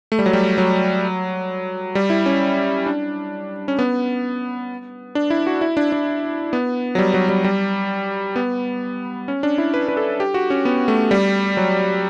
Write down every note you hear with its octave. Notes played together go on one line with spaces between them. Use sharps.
A3
G3
F#3
G3
F#3
G3
E4
C#4
D4
C#4
B3
D4
E4
F#4
E4
D4
D4
B3
F#3
G3
F#3
G3
G3
B3
C#4
D4
E4
B4
B4
A4
G4
F#4
C#4
B3
A3
G3
F#3